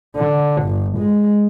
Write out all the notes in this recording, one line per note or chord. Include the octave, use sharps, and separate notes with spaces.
D3
G1
G#3